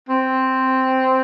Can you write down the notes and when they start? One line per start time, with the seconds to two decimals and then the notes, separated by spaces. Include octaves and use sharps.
0.09 C4